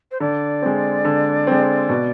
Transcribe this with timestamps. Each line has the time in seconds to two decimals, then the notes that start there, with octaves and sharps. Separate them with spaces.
0.12 C5
0.20 D3 D5
0.62 G#3 C4
1.05 D3
1.47 G#3 C4
1.89 B2